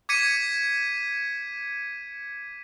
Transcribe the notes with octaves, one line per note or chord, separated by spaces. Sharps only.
D6 G#6 B6 C#7 D#7